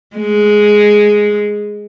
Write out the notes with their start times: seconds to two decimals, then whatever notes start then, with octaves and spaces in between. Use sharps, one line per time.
0.16 G#3